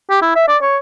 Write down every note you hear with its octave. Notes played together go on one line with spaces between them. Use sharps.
G4
E4
E5
D5
C#5